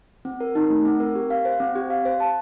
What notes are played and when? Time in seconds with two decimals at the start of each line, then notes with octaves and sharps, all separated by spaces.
0.25 C4
0.41 A#4
0.55 D#4
0.70 A3
0.85 C4
1.00 A#4
1.15 G4
1.30 F5
1.45 C5
1.60 C4
1.75 G4
1.90 F5
2.05 C5
2.20 A5